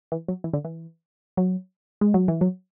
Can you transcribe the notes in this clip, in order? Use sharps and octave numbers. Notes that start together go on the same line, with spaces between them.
E3
F#3
E3
D3
E3
F#3
G#3
F#3
E3
F#3